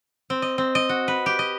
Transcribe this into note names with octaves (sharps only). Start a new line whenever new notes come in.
C4
D#5
C4
D#5
F#4
B4
G4
D#5